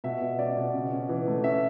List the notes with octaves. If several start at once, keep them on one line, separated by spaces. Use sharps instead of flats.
B2 E5
B2
C#4 D5
B2
C#3
C#4
E3
A3
C#4 E5